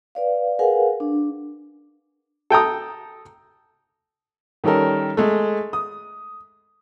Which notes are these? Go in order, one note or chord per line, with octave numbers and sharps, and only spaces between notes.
B4 D5 F5
G#4 A#4 B4 F5 F#5 G#5
D4
A4 G5 A#5 D#6
D#3 G3 C#4 A4 A#4
G#3 A3
D#6